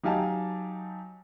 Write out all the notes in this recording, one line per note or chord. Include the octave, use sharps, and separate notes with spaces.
F#3 D#4 G4 F5 G#5 A5